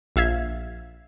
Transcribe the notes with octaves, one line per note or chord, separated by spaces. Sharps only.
A#1 E5 F5 G#6